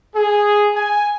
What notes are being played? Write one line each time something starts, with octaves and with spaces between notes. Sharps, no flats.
G#4
G#5